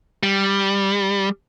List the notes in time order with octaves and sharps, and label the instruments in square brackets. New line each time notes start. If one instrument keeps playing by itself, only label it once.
[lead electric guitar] G3